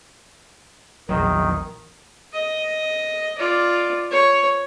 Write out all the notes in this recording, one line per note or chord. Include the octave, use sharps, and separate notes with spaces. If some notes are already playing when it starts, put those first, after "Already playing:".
A#1 E2 D#3 F#3
D#5
F4 D5
C#5